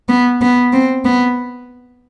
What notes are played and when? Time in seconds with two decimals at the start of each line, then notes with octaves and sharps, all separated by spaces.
0.09 B3
0.41 B3
0.73 C4
1.05 B3